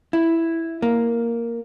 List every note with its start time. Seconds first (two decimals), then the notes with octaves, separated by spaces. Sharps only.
0.13 E4
0.82 A#3